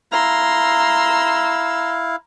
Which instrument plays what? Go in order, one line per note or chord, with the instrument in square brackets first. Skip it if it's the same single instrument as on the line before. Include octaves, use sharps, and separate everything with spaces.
[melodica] E4 F5 [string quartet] A#5 C6 E6